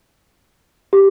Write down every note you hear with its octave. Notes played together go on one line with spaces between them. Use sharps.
G4